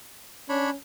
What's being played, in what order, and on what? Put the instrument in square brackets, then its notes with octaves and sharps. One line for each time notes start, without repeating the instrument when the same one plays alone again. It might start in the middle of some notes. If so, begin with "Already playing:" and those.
[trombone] C#4 [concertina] D4 C#5 B5